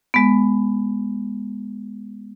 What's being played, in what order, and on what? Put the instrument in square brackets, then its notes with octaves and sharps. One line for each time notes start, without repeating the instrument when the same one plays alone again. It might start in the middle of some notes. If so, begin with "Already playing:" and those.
[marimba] G#3 B3